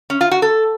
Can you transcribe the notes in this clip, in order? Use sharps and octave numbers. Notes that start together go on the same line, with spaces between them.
C#4
F4
F#4
A4